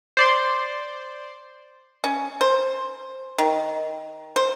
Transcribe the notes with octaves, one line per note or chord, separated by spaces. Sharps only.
C5 D5 C6
C#4
C5
D#3
C5